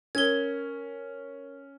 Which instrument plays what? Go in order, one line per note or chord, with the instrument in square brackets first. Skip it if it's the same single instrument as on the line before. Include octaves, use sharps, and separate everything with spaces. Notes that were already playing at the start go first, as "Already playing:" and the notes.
[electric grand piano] C#4 [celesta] A#4 [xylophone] G#6 G7